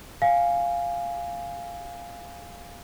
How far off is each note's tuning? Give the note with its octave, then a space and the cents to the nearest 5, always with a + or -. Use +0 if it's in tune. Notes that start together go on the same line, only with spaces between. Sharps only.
F5 +0 G#5 -5